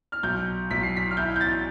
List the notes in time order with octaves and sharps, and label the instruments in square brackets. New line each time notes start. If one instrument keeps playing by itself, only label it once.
[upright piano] F6
[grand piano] B1 [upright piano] G6
[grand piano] B1 [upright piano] B6
[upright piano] C7
B6
F6
[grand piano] E4 [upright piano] G6
[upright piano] G6
A6